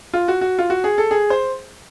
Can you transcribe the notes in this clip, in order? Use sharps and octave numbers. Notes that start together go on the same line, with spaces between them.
F4
F#4
F#4
F4
F#4
G#4
A4
G#4
C5